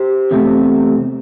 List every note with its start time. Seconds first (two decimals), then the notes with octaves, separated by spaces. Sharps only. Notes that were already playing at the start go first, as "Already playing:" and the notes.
Already playing: G4 C5
0.31 E2 C3 A3 C4